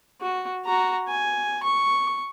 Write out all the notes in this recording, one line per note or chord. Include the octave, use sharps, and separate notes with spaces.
F#4
F#4 A#5
G#5
C#6